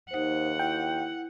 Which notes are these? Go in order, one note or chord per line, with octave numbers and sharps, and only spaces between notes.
D#2 D#4 C5 F#5
E4 G5